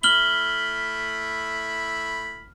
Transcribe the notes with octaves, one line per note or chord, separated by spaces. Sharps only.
A3 E4 B5 F6 F#7 G7